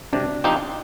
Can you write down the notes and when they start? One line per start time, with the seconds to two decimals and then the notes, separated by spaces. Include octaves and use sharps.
0.13 C3 D4
0.44 F3 C4 D#4 G4